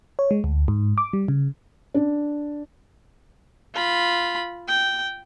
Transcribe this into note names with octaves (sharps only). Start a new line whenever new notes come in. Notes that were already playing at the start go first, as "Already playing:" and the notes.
C#5
G#3
D2
G#2
D6
G3
C#3
D4
F4 B5
G5